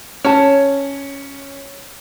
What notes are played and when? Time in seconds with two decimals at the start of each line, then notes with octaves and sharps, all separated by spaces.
0.25 C#4 C#5 A5